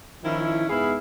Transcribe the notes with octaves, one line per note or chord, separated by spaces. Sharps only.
D#3 F3 C#4 E4
G#2 B3 E4 G#4 F5 B5